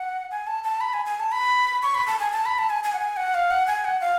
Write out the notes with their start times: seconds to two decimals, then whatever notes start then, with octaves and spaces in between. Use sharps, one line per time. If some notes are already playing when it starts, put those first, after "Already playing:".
Already playing: F#5
0.31 G#5
0.47 A5
0.64 A5
0.81 B5
0.93 G#5
1.06 G#5
1.20 A5
1.32 B5
1.83 C#6
1.95 B5
2.07 A5
2.20 G#5
2.32 A5
2.46 B5
2.58 A5
2.70 G#5
2.84 G#5
2.93 F#5
2.99 G#5
3.17 F#5
3.34 F5
3.51 F#5
3.67 G#5
3.85 F#5
4.01 F5